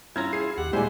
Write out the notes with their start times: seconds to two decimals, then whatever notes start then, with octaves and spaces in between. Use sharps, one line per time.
0.16 G2 C#4 E4 F4 A#5 G#6
0.33 G#4 C7
0.58 D#2 G4 F#5
0.73 A#2 G3 G#3 E4 G4 C5 G#5